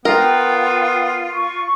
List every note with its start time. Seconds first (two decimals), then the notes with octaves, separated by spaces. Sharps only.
0.05 B3 F4 A#4 G5
1.33 C#6